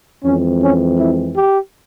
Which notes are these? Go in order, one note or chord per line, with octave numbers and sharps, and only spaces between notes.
F2 E3 G#3 C4 C#4
C#4
E4
G4